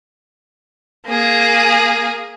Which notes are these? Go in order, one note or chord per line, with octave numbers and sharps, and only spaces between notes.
A#3 G#4